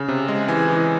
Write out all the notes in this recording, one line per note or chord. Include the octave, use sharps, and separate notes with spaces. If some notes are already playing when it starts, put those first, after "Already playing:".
Already playing: C#3
C3
G#3
E3 G#5
E3